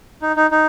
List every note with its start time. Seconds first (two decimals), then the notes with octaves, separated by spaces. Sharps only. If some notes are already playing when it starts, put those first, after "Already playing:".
0.22 D#4
0.36 D#4
0.51 D#4